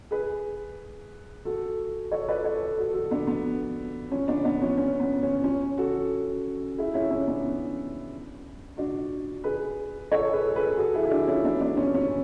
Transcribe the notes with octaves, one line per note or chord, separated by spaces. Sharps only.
G#4 B4
F#4 A4
A4 C#5
B4 D5
A4 C#5
F#4 A4
F#4 A4
B3 D4
B3
C#4
B3 D4
B3 D4
C#4
C#4
B3
C#4
C#4
F#4 A4
E4 G#4
C#4 E4
C#4
B3 D4
D4 F#4
G#4 B4
A4 C#5
G#4 B4
A4
G#4 B4
F#4 A4
E4 G#4
E4
D4 F#4
C#4 E4
B3 D4
B3 D4
C#4
C#4